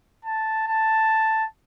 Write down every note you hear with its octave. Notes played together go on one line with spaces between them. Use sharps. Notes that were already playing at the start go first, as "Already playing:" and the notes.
A5
A5